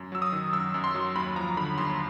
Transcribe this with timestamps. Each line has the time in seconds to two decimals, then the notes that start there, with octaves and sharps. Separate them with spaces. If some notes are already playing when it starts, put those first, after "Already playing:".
Already playing: F#2
0.12 F#3 E6
0.22 D#6
0.32 D#3
0.53 F#2 E6
0.74 F#2
0.84 C6
0.95 F#3
1.15 D#2 B5
1.36 F3 A#5
1.57 D3 B5
1.78 D#2 C6